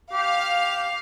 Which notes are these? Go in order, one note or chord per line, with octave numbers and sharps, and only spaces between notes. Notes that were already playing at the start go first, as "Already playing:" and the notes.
G4 F5